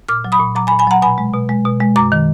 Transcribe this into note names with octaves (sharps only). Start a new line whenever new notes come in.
A#2 D6 F6
F#3
B5 D#6
A#2
F#3 A#5 D6
G#5 B5
A#2
G#5 B5
F#3 F#5 A#5
B2 G#5 B5
G#3
B2
G#3
B2
G#3
F#2 A#5 D6
D#3